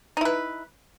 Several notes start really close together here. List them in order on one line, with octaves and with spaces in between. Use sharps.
D#4 E4 B4